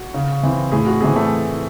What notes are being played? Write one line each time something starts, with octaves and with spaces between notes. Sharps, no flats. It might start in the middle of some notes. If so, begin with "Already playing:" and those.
Already playing: F#4
C#3
E3 C4
A2 G#4
F#4
E3 A3 C4 G#4
A3 A4